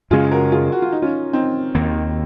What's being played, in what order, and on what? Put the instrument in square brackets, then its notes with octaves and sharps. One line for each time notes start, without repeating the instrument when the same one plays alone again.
[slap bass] F#2 C#3 G#3 C#4 [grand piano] F4 G#4
[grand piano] F#4 A#4
F4 G#4
F#4
F4
D#4
C#4 F4
C4 D#4
[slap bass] D#2 D#3 A#3